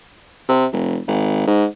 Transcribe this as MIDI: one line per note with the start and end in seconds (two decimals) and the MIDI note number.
0.49 0.66 48
0.72 0.99 29
1.07 1.47 32
1.47 1.65 44